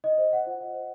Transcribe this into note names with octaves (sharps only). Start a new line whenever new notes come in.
D#5
C5
F#5
F4
D#5
C5